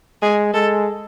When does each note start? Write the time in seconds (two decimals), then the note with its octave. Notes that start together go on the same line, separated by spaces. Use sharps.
0.22 G#3 G#4
0.54 G#3 A4